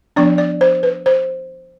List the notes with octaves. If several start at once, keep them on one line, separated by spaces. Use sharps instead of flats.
F3 B3 D4 D5
D5
C5
B4
C5